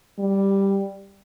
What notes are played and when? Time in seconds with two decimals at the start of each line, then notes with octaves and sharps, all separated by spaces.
0.19 G3